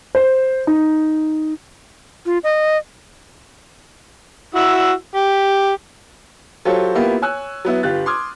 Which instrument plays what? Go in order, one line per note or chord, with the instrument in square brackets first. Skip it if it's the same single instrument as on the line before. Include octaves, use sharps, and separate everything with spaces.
[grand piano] C5
D#4
[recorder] F4
D#5
[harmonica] E4 F#4 E6
G4
[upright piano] F#3 F4 G4 A4 C5 C#5
A#3 B3 E4 F4 G4
C#5 G#5 E6 F#6
F#3 B3 E4
G1 F4 G4 F#6 A6
C6 D6 D#6 F6 G#6